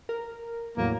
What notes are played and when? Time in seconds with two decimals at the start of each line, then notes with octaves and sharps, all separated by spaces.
0.09 A#4
0.77 E2 A2 F#3 A#3